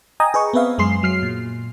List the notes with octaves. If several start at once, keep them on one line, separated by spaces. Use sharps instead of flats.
D#5 G5 G#5 A#5 D#6
G#4 B4 D#5 C#6
B3 C4 B4 E5 F5
F#2 G#3 G#4 C6 C7
F#3 F6 C7
A#2